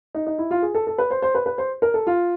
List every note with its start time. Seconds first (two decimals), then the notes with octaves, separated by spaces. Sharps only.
0.15 D#4
0.27 D#4
0.39 E4
0.51 F4
0.62 G#4
0.75 A4
0.87 A4
0.98 B4
1.11 C5
1.22 C5
1.35 B4
1.46 B4
1.58 C5
1.82 A#4
1.94 A4
2.07 F4